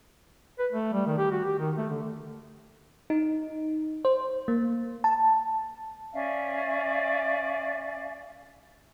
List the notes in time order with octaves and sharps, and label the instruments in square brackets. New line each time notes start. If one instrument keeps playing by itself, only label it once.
[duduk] B4
A3
G3
D#3
G4
F#4
G4
D#3
A3
D3
[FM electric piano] D#4
C5
A#3
A5
[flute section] C#4 D5 E5 F5